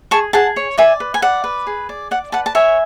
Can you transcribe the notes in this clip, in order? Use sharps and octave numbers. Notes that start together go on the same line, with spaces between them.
G#4 A5 C#6
G#4 F#5 A5
C#5
D5 E5 G#5
B4
G#5
D5 F#5
B4
G#4
D5
D5 F#5
B4 F#5 A5
A5
C#5 E5 G#5